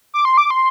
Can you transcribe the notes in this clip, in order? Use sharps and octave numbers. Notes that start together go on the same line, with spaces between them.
D6
C6
D6
C6